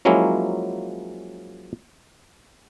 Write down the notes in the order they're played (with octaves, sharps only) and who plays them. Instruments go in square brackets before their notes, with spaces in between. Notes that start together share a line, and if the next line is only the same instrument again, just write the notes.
[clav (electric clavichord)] F3 F#3 G#3 A#3 C#4 E4